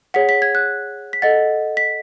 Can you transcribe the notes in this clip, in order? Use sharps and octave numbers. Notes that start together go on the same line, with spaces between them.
G#4 C#5 F#5 B6
B6
G#6
F#6
B6
A4 D#5 F#5 A6
B6